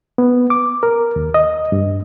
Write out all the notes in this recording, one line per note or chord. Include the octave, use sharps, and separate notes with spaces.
B3
D6
A#4
D#2
D#5
G2